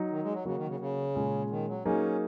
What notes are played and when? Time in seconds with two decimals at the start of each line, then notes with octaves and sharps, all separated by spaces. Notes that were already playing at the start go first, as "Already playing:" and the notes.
Already playing: F#3 D#4 F#4
0.10 D#3
0.23 G#3
0.33 F#3
0.45 C#3 F#3 A#3 F#4 A#4
0.56 D#3
0.68 C#3
0.80 C#3
1.15 A#2 G#3 C#4 G#4
1.50 D#3
1.68 F#3
1.85 F#3 A#3 C#4 D#4 G#4